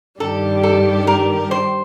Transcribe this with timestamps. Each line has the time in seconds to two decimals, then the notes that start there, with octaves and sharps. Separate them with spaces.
0.20 G2 D#3 G3 D4 G4 A4
0.63 A4
1.07 A#4
1.51 C5